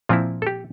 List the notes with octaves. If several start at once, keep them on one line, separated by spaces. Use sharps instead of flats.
A#2 F3 C4 E4 F4
A4
G4